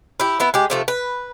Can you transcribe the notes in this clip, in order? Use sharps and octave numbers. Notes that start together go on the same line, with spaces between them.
E4 G4
B3 E4 B4
G#3 G4
C3 F3 A3
B4